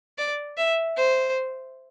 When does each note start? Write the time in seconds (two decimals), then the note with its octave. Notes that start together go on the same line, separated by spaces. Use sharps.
0.18 D5
0.57 E5
0.97 C5